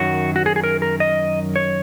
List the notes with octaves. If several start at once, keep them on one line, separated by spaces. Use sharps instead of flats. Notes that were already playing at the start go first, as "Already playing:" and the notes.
Already playing: F#2 D#3 F#3 F#4
F#4
G#4
G#4
A#4
A#4
D#5
C#5